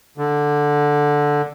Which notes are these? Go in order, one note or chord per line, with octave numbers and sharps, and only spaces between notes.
D3